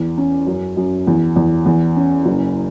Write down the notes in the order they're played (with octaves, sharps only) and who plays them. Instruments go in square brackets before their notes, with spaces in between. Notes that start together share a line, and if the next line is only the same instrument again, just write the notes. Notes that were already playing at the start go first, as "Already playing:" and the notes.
Already playing: [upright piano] E2
C#4
F#2
F#2
E2
E2
E2
C#4
F#1